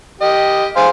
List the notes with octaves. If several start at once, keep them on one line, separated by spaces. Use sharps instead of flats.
G4 D#5
G#4 C5 F5